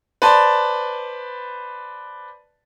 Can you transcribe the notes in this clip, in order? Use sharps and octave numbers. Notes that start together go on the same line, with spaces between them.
B4 C5 D5 A5